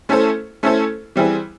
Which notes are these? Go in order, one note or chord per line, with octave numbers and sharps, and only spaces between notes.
A3 C#4 E4 A4 C5
A3 C#4 E4 A4 C5
E3 G3 C4 E4 G#4